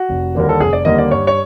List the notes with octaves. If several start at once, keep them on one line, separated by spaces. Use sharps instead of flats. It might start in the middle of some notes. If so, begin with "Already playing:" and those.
Already playing: F#4
F1
D#2 D3 G3 A#3 A#4
A4
F1 G#4
D5
D#2 D3 G3 A#3 D#5
D5
G2 C#5
C#5